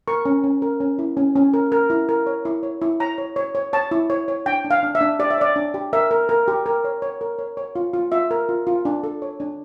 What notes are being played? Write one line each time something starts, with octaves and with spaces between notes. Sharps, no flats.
A#4 C#6
C#4
C#4
A#4
C#4
E4
C#4
C#4
A#4
A#4
E4
A#4
C#5
E4
C#5
E4
C#5 A#5
C#5
C#5
C#5
C#5 A5
E4
C#5
C#5
D4 G5
D4
F5
D4
E5
D4
G4 D5
E5
C#5 D5
D4
G4
A#4 E5
A#4
A#4
G4
A#4
C#5
C#5
A#4
C#5
C#5
F4
F4
F4 E5
A#4
F4
F4
D4
A4
C#5
D4